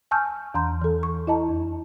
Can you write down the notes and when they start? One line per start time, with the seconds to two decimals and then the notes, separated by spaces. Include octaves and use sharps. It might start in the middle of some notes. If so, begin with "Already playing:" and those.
0.11 G#5 A5 C#6 E6 F6 G6
0.54 E2 E3 A#5 C6 G6
0.82 E3 A4
1.03 C#6
1.27 E4 D#5 A5 A#5
1.48 F2